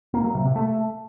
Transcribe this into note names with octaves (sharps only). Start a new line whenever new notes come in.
A#3
F#3
C3
C3
A3